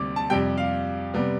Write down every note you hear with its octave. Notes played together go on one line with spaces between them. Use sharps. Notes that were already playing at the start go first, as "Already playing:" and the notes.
Already playing: D2 C3 G3 D6
A5
F2 C3 G3 G5
F5
C3 G3 B3